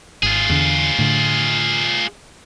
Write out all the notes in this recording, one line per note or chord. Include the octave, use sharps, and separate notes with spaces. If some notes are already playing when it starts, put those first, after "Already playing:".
G#1 F4 G#4
E2 D3
A2 D3